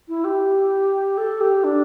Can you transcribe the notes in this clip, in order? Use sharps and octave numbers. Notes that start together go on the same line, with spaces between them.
E4
G4
A4
G4
D4